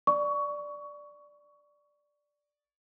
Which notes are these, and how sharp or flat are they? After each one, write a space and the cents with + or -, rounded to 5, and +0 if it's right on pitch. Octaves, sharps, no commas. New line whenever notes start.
D5 +0 C#6 +20